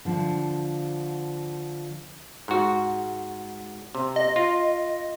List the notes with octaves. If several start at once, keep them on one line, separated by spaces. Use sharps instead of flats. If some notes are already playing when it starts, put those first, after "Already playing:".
D3 F3
G#2 F#4
C3
D#5
F4